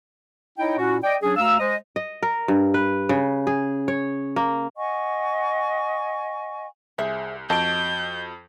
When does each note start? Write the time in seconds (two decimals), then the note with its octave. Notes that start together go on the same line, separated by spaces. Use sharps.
0.58 D#4 E4 C#5 D#5 G5
0.78 A#2 C#4 E4 F#4
1.03 D5 D#5 G5
1.22 F#3 C#4 D4 G#4
1.37 D2 F5 A#5 E6
1.60 G#3 C5 D#5
1.96 D#5
2.22 A#4
2.48 G2
2.74 B4
3.09 C#3
3.47 G#4
3.88 C#5
4.36 A#3
4.77 D#5 F#5 G#5 C#6
6.98 C2 G#4 C5 E5
7.50 F2 F#4 D#5 A5 G6 D7